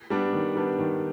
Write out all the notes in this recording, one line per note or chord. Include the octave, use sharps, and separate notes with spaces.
G3 B3 D4
D#3
G3 B3 D4
D#3